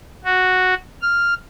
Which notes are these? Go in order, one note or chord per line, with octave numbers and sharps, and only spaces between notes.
F#4
F6